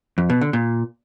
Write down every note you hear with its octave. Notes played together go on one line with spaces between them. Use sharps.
F2
B2
D3
A#2